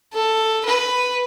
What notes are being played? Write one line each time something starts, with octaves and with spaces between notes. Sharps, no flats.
A4
B4